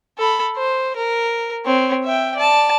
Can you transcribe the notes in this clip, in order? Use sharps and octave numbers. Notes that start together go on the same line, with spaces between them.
A4 B5
C5
A#4
C4 C#5
E5 G5
D5 A5